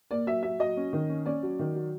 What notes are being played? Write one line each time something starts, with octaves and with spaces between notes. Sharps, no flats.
A#3 D5
F#3 E5
F#3 E5
F#3 D#5
C#4
D#3
C#4
C#4 D5
F#3
D#3
F#3